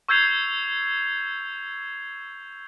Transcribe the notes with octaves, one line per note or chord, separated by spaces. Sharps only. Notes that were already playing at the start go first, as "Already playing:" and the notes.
C#6 E6 G6 G#6 C7 F7